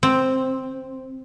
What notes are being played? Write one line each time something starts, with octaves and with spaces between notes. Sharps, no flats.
C4